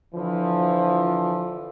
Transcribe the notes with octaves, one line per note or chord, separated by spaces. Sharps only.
D3 E3 F3